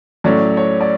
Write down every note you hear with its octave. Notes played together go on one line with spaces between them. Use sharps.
A2 F#3 A3 C#4 D5
C#5
D5